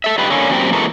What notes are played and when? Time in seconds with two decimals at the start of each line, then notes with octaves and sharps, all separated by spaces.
0.04 A4 E5
0.18 D#4 F4 G4 B4
0.30 D3 A#3 C#4
0.51 F#2 A#2 C4 G4 A#4
0.73 E3 G#3 A#3 F#4 A4 A#5